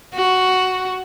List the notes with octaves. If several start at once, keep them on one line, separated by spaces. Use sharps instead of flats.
F#4